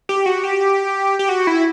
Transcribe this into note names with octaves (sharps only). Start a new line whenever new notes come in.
G4
F#4
G4
G4
F#4
E4